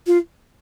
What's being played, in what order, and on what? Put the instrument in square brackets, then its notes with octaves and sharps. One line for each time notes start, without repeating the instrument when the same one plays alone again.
[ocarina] F4